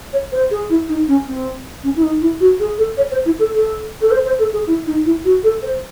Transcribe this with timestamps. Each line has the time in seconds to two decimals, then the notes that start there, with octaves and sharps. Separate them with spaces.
0.13 C#5
0.32 C5
0.51 G#4
0.70 E4
0.89 D#4
1.08 C#4
1.27 C4
1.84 C#4
1.96 E4
2.03 D#4
2.21 E4
2.40 F#4
2.60 G#4
2.78 A4
2.97 C#5
3.11 C5
3.25 E4
3.39 A4
3.54 A4
4.01 A4
4.11 C5
4.25 C5
4.39 A4
4.53 G#4
4.67 E4
4.87 D#4
5.06 E4
5.25 F#4
5.43 A4
5.63 C5